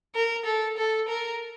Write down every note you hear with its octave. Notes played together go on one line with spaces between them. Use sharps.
A#4
A4
A4
A#4